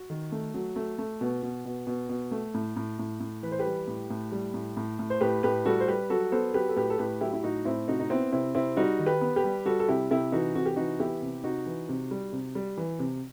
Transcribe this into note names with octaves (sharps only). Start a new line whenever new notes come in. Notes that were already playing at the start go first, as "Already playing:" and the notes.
Already playing: F#4
D#3
A3
F#3
A3
A3
B2
B2
B2
B2
B2
A3
A2
A2
A2
A2
E3 B4
C5
G4 B4
G3
A2
A2
G3
A2
A2
A2
C5
A2 G4 B4
A2 G4 B4
G3 F#4 A4
C5
G3 G4 B4
F#3 F#4 A4
B3 A4 C5
F#3 G4 B4
A4
A2 G4 B4
A4
A2 G4 B4
F#3 E4 G4
E4
A2 D#4 F#4
A2 C4 E4
C3 D#4 F#4
D#4
B3 C4 E4
C3 C4 E4
C3 C4 E4
G3 D#4 F#4
D#3
G4 B4
B3
G4 B4
G3
G3 F#4 A4
A4
C3 E4 G4
C3 E4 G4
E3 D#4 F#4
C3 F#4
G4
E3 D#4 F#4
B3 E4 G4
C3
C3 D#4 F#4
E3
C3
G3
C3
G3
E3
C3